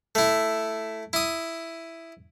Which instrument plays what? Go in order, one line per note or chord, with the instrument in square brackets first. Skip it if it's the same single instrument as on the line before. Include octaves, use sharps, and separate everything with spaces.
[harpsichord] A3 E4
E4 D#6